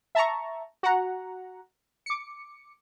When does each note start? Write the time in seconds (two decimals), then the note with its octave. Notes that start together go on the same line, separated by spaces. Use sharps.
0.15 E5 A5 A#5 C#6
0.83 F#4 F#5 A#5
2.06 D6 C#7